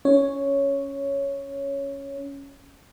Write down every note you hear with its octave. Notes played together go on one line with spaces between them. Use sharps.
C#4 C#5